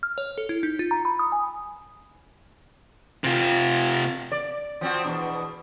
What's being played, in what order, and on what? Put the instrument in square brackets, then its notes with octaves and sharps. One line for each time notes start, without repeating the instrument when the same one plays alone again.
[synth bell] F6
C#5
A4
E4
D#4
F4
A#5
B5
D#6
G#5
[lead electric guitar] C3 F4
[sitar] D5
F3 C4 F#4
E2 B2 D4